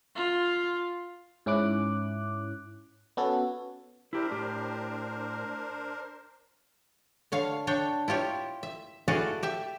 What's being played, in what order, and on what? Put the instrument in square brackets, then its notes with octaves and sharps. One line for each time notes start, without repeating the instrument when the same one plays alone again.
[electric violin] F4
[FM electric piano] G#2 C#4 E4 D6 F#6
B3 C#4 F#4 A4 C#5
[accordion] D4 A#4 C5 [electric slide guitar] E4 G4
[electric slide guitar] A2 G4
[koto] D3 C#5 F5
D4 C#5 G5
E4 F4 G4 C#5
E5
E4 F#4 G#4 A4 D5 F5
G4 E5